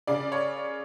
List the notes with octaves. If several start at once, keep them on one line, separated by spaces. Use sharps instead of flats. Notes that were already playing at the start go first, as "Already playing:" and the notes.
C#3 D5
C#5